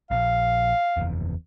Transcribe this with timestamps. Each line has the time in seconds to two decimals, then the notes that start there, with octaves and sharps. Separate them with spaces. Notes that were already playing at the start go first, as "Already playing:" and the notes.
0.11 A#1 F5
0.97 F#1 E2